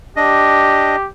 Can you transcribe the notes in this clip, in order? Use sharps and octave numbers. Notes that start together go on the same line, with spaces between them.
D4 G4 D#5